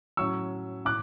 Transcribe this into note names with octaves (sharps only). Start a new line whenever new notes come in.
A2 F#3 C#4 C#6 E6
A2 D6 F#6